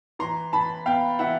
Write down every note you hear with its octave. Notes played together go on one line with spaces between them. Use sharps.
E3 A#5 C6
E3 A5 B5
B3 F5 G5
E3 E5 F#5